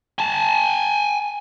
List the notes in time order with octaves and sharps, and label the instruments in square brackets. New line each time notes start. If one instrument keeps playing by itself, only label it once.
[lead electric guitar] G#5 A5